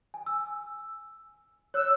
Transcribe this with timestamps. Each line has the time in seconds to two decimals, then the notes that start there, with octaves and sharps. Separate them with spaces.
0.14 G#5
0.26 E6
1.74 C#5 E6 F#6